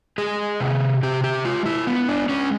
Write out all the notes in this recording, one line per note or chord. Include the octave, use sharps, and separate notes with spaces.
G#3 G#4
C3
C3 G4
G4
G#3 F4
E4
B3
D4
G#3 C#4